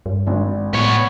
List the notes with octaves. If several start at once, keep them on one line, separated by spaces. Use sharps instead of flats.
G2
G#1 D4
A2 B3 C#5